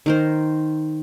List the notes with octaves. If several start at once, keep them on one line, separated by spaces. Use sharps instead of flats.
D#3 A#4 C5